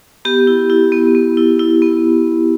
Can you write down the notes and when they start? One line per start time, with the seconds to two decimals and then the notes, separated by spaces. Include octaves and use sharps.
0.25 B3 G4
0.47 E4
0.70 E4
0.92 B3
1.15 B3
1.37 E4
1.59 E4
1.82 B3